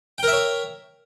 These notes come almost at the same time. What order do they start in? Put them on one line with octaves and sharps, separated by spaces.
G5 A#4 E5 C#5